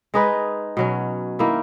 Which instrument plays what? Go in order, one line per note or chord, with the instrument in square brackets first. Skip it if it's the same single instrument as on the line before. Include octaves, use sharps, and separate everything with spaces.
[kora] G#3 D#4 G#4 B4
B2 F#3 C#4
D#3 A#3 E4